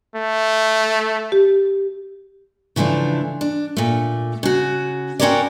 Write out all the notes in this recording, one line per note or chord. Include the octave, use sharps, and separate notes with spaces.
A3
G4
C#3 E3 F3 A3 D4
D4
A#2 A3
C#3 F#4
C4 C#4 F#4 A#4 C#5 D5